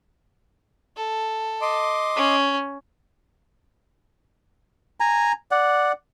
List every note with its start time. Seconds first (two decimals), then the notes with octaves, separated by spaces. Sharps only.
0.97 A4
1.61 D#5 C6 D6
2.16 C#4
5.00 G#5 A#5
5.51 D5 F#5